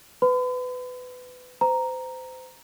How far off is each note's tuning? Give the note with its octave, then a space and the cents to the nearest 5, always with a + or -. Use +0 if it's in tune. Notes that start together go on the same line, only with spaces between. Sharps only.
B4 +20 B5 +45
C5 -35 A#5 +0